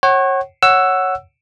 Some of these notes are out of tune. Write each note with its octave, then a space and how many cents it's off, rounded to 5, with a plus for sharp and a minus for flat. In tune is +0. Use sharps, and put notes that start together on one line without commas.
C#5 -30 F#5 +30
C#5 +0 F#5 +0 E6 +10